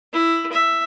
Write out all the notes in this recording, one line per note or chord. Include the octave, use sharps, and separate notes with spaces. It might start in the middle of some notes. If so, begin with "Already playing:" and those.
E4
E5